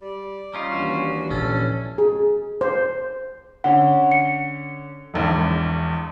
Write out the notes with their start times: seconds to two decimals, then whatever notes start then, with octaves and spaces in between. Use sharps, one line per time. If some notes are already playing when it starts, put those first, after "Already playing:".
0.01 G3 D5
0.54 G3 C#4 D#4 F4
0.71 D#2 E3 D4 F#4
1.30 A#1 C#4 A4
1.98 G#4
2.61 C5
3.64 D3 C#4 F#5
4.12 C#7
5.14 E1 A#1 E2